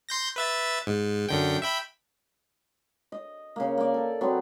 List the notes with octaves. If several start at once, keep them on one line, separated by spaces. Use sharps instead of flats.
C6 G6 A#6
B4 E5 A6
G#2
F#2 D3 G5
E5 G5 B5
D#5
C#3 A#3
A#3 D5
A4
F#3 B3 C4